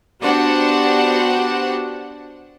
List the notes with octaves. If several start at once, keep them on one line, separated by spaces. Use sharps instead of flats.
B3 D4 F#4 G4 C5 F#5